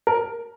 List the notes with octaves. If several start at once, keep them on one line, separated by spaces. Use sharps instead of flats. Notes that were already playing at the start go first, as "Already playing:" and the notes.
A#4